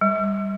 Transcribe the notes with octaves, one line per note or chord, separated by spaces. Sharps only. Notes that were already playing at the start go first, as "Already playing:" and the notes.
G3